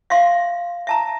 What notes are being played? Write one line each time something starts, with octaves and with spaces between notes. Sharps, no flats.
E5 F5 C6
E5 A5 A#5